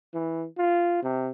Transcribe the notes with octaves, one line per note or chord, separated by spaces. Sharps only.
E3
F4
C3